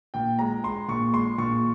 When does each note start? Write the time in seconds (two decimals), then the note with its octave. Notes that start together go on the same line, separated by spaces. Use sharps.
0.14 A#2 G5
0.39 G#3 A#5
0.63 G#3 C6
0.88 A#2 C#6
1.13 G#3 C6
1.38 A#2 C#6